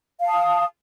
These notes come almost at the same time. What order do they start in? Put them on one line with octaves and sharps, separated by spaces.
F5 A5 D#6